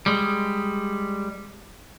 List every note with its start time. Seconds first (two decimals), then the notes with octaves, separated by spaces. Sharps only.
0.06 G3 G#3